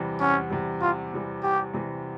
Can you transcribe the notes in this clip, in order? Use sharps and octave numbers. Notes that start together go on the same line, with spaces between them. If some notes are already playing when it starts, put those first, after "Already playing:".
Already playing: E2 C3 E3 G3
E2 C#4
C3 E3 G3
E2 F4
C3 E3 G3
E2 G4
C3 E3 G3